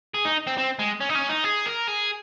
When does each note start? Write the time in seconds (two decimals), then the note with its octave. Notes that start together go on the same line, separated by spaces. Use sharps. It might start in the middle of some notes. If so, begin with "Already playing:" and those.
0.14 G#4
0.25 D#4
0.47 C4
0.58 C4
0.79 G#3
1.01 C#4
1.09 D#4
1.15 C#4
1.29 D#4
1.44 G#4
1.66 A#4
1.87 G#4